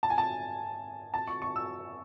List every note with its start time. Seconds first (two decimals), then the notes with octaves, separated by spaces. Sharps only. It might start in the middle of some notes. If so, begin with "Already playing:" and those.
0.03 A5
0.10 G#5
0.18 A5
1.14 A5
1.28 C#6
1.42 C#6
1.56 E6